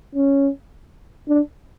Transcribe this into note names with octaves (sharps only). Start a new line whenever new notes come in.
C#4
D4